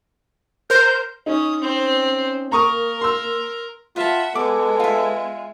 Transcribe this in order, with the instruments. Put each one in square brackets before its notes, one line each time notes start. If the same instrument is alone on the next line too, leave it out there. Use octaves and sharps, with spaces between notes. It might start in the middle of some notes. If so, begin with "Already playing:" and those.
[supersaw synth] A#4 C5 [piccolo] G6
[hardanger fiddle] C#4 D#6 [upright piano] D#4
[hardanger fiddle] C4 [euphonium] C#4
[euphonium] A#3 [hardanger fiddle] A#4 [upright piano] A#5 C#6 D#6
[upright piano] C6 E6
[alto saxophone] F4 [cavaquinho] B4 A5 [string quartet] E5 F#5
[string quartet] G#3 [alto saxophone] B3 [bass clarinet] A4 [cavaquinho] D6
[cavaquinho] F4 E5